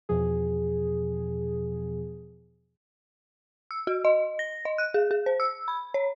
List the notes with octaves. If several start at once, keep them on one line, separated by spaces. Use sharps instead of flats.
E2 B2 F3 G#4
E6
F#4
D#5
A#6
D#5
F#6
G#4
G#4
C5
E6
B5
C#5